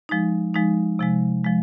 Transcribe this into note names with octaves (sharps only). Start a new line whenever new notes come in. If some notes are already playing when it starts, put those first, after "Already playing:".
F3 G#3 D#4
F3 G#3 D#4
C3 F3 G#3
F3 G#3